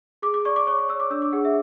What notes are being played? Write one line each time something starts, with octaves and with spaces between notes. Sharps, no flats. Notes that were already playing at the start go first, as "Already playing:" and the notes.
G#4 D6
D6
D5 C#6
D6
C#5 C#6
D6
C#5 E6
D6
D4 E6
D6
G#4 F#5
E5